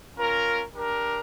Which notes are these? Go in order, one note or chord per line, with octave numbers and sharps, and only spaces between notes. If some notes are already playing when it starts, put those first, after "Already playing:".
C#4 F4 A#4
D4 G4 A#4